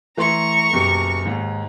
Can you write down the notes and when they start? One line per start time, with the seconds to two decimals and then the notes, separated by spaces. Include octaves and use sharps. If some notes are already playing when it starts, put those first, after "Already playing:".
0.17 E3 A3 A#5 C6 C#6
0.73 F#1 B2 G4
1.25 D#2 G#2